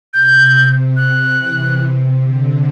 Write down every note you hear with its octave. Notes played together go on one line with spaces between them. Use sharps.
C3 G6
F#6
E3
C3
D3